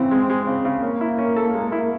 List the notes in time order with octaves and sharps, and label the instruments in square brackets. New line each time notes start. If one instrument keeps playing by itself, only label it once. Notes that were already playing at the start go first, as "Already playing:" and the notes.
Already playing: [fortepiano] C#3 E3 [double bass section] C4
[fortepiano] G#3
G#3
C#3
C#3
[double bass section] A#3 [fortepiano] C#4
[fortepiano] E4
C#4
A4
G#3
E4